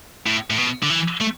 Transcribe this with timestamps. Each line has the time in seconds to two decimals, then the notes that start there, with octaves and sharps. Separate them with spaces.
0.27 A2
0.50 A2
0.58 B2
0.83 D3
0.90 E3
1.21 A3